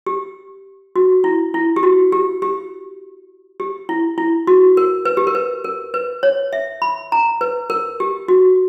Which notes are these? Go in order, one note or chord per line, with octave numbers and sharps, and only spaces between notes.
G4
F#4
E4
E4
G4
F#4
G4
G4
G4
E4
E4
F#4
A#4
B4
G4
A#4
B4
A#4
B4
C#5
E5
B5
A#5
B4
A#4
G4
F#4